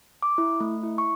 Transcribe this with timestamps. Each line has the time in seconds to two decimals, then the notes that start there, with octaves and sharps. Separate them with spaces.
0.22 D6
0.38 E4
0.60 A3
0.83 E4
0.98 C#6